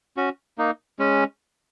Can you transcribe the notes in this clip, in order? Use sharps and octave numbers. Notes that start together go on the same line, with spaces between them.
C#4 F#4
A#3 D#4
G#3 C#4